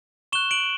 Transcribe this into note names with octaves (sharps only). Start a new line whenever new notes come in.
C#6 F#6 E7 G7
D7 F#7